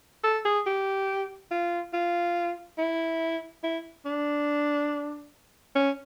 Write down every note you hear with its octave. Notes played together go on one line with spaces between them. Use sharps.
A4
G#4
G4
F4
F4
E4
E4
D4
C#4